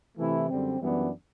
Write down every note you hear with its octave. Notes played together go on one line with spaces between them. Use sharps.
C3 E3 A3 E4
F#2 D3 G3 C4
F#2 E3 G3 B3 D4